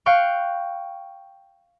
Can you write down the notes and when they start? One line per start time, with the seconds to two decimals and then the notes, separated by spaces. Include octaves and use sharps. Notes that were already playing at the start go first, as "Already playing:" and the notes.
0.06 F5 G5 C#6 F#6